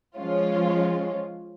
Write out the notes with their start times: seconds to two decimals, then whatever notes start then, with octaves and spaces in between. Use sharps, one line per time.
0.16 F3 G#3 C#4 F4